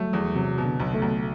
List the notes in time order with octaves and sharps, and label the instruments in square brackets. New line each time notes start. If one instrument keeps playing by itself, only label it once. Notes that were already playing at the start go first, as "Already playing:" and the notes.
Already playing: [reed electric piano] F#3 G3 [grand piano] A3
[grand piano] E2
[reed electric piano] C3 [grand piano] F#3
[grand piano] B2
[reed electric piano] D3
[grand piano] B1
[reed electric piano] A3
[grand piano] B1